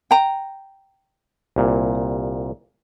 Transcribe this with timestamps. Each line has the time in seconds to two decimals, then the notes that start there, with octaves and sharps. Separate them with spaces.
0.11 G5 A#5
1.56 C2 A#2